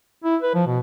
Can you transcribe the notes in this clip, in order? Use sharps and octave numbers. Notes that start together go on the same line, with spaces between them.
E4
B4
F3
B2